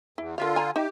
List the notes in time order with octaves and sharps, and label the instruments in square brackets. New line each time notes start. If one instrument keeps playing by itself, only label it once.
[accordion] E2 [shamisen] E4
[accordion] D3 F4 [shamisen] A#4 E5 F5
[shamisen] G#5 A#5
[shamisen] D#4 E5 [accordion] G4